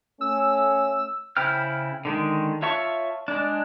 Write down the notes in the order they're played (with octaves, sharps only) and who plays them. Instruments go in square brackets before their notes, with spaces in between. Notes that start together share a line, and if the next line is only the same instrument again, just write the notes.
[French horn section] A3 C#4 [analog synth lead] E6
[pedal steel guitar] C#3 E4 C5 G5 F6
D3 D#3 G#3
F4 C#5 E5 A5 C#6
G#3 D4